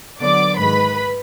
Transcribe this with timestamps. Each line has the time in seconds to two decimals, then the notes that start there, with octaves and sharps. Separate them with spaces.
0.21 D3 F#3 B3 D5 D6
0.58 G#2 D#3 G#3 B4 B5